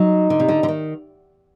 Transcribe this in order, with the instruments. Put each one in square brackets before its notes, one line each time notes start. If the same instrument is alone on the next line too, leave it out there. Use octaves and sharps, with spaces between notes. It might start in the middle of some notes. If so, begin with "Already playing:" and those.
Already playing: [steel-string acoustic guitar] F#3 [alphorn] D#4
[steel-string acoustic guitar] D3
C3
D3
D3
D#3